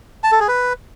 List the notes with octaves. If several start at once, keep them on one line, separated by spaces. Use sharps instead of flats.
A5
A4
G#4
B4